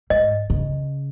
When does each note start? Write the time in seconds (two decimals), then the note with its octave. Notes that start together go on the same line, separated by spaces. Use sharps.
0.10 G#2 D#5
0.50 C#3